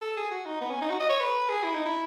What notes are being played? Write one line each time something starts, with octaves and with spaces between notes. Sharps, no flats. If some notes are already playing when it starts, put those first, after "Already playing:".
A4
G#4
F#4
D#4
B3
C#4
D#4
F#4
D#5
C#5
B4
G#4
E4
D#4
E4